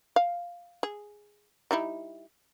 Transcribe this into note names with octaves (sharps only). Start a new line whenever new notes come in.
F5
G#4
G3 D#4 E4